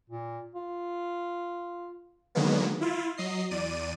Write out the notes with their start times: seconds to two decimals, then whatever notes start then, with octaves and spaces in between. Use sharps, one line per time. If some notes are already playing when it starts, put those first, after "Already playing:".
0.10 A#2
0.55 F4
2.35 D3 D#3 F#3 G#3 A#3 B3
2.81 E4 F4
3.17 F#3 D#5 C7
3.51 E2 D5 D#7